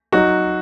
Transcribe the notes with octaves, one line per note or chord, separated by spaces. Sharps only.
F#3 D#4 F#4